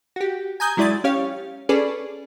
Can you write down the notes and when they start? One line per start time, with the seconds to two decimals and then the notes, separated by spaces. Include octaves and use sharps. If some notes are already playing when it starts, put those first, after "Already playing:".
0.16 F#4 G4
0.60 G#5 A#5 D#6 G6 G#6
0.77 F#3 G#3 E4 D5 D#6 A6
1.04 C#4 G4 C#5 F5
1.69 C#4 G#4 A4 B4 D5